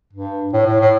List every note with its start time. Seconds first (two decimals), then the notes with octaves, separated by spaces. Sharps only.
0.13 G2
0.53 A2
0.66 A2
0.80 A2